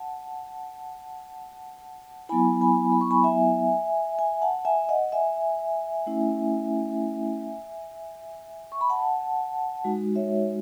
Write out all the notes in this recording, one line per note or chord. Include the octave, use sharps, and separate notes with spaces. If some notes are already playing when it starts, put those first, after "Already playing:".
Already playing: F#5 A5
F#3 B3 E4 G#5 B5
G#5 B5
B5
C#6
G#5 B5
E5 G#5
E5 G#5
F#5 A5
E5 G#5
D#5 F#5
E5 G#5
A3 C#4 E4
C#6
B5
F#5 A5
G#3 D#4 F#4
C#5 E5